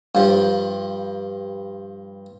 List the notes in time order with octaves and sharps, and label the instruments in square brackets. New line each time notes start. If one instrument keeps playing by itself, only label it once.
[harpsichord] G2 F3